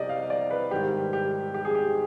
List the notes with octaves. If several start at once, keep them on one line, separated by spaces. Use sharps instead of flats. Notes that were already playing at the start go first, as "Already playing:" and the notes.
Already playing: C2 C3 G3 G4 D5 D#5
F5
D5
B4
G#2 D#3 G3 G4
G4
G4
G#4
G4